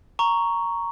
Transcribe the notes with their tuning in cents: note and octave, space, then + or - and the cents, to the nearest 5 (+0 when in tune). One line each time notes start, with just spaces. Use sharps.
A#5 +0 C#6 +5